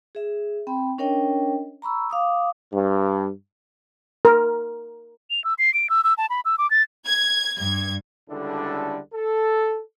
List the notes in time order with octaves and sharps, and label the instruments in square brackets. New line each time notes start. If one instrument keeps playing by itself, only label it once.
[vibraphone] G#4 E5
C4 G5 B5
C#4 D4 A#4 C#5 D#5 G5
A#5 B5 C#6 E6
F5 D6 D#6
[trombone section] G2
[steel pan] A#4
[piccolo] F7
E6
C7
D7
E6
E6
A5
B5
E6
D6
A6
[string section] G#6
G2 G#6
[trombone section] C#2 D3 G3 D4 E4 A4
A4